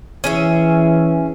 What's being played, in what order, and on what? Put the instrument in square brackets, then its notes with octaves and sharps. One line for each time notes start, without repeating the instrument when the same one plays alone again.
[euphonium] E3 [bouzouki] C#4 G#4 E5